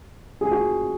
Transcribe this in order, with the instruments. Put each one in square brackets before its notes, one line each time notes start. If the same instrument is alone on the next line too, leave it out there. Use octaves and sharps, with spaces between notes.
[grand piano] G#4
F#4